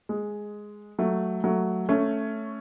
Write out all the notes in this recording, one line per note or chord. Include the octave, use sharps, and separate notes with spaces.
G#3
F#3 A3
F#3 A3
A3 C#4